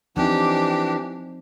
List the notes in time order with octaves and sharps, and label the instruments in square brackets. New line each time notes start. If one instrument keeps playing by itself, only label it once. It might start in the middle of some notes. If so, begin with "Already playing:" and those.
[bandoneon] E3 D4 [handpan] F3 C4 D#4 [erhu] G4